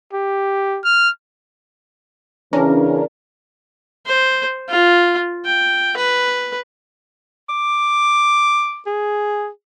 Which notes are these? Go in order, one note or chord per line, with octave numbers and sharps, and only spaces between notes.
G4
F6
E2 C#3 E3 C#4 D4 A#4
C5
F4
G5
B4
D6
G#4